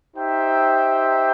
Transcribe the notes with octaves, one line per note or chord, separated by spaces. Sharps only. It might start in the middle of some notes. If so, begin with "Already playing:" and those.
D#4 G4 C5 E5 G5